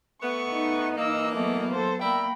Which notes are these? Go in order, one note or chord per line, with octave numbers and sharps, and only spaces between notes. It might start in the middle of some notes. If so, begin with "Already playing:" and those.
A3 B3 C#6
D#4
E3 A#3 D#5 E6
F#3 A3 B3 D#5
A4 C5
A#3 A#4 D5 E5 G5 B5